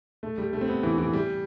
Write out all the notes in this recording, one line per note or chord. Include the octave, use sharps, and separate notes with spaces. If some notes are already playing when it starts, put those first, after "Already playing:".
A3
G3
A3
C4
B3
E3
E3
G3